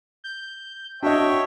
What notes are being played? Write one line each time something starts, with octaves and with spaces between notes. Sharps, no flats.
G6
D4 F#4 C#5 D#5 E5 G5